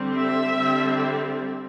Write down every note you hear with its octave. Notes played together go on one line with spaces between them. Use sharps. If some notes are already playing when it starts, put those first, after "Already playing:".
Already playing: D3 G3 C4
E5
D3 G3 C4